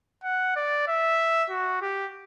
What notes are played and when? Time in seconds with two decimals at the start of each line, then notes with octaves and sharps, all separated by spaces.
0.24 F#5
0.56 D5
0.88 E5
1.50 F#4
1.82 G4